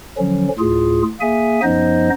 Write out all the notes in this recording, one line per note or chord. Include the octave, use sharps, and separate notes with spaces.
D3 F3 F#3 C#4
D2 A2 F4 G#4
A#3 G#4 E5 G#5
F#2 F3 B3 D#4 C5 D#5